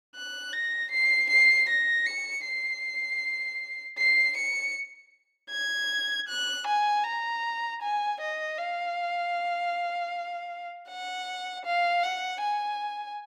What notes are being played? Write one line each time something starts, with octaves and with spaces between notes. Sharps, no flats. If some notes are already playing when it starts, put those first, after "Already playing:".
F#6
A#6
C7
C7
A#6
C#7
C7
C7
C#7
G#6
F#6
G#5
A#5
G#5
D#5
F5
F#5
F5
F#5
G#5